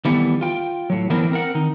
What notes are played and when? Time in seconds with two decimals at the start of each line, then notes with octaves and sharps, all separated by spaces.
0.05 D#3 E3 G3 A3 B3
0.41 F4 G5
0.90 A2 F#3
1.10 E3 B3 C4 D4 E4 A#4
1.31 C4 A#4 F#5
1.55 D#3 D#4